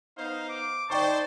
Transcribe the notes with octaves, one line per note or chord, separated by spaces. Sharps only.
B3 D#4 C5 F5
D6
D#4 C5 D5 G5 A5 C#6